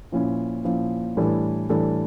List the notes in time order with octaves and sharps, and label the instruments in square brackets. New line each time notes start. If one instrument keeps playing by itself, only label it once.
[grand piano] A#2 F3 C#4 E4
A#2 F3 C#4 E4
A2 E3 G3 D4 A4
A2 E3 G3 D4 A4